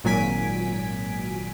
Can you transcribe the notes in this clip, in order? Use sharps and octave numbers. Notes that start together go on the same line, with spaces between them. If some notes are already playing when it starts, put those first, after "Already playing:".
G#1 A#2 F#3 G#5 B6 D7